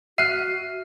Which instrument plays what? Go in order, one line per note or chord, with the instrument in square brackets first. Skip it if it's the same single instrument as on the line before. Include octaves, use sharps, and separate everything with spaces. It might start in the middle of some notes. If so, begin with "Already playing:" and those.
[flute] F#4 [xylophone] E5 F#6 [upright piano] F6 C7 D#7